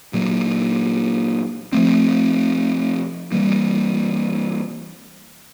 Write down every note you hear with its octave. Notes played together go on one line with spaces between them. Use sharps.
A#2 F#3 A#3
F3 A3 C4
E3 G3 A#3